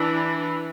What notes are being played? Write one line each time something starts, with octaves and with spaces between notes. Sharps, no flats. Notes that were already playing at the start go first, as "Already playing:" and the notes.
Already playing: E3 D4